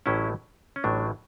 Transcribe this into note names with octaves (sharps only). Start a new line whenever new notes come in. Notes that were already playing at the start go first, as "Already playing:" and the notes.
A1 A2 F#3 C#4 E4
C#4
A1 A2 F#3 D4